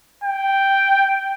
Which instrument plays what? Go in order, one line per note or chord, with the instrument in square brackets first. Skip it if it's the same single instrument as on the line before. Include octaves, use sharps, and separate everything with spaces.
[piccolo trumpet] G5